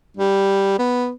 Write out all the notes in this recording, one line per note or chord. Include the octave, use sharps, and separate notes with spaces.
G3
B3